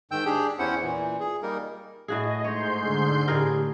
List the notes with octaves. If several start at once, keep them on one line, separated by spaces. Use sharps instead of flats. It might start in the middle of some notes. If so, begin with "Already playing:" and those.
G#2 D#3 G5 E6 G6
D4 G4 G#4
E2 C#4 E4 C5 F#5
A#2 E3
G#4
G3 A#3 D#4 A#4
A2 F#4 G#4 D#5
G#2 C#5 C6 G6
D3 G#4
A2 G4 G#4 A#4